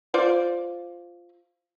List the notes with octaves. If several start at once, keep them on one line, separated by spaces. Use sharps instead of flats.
F4 C5 D5